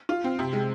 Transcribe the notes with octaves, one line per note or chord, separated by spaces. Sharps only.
F4
C4
C3
G#3